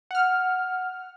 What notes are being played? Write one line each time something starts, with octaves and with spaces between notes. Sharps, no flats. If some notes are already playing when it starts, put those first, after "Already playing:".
F#5 F6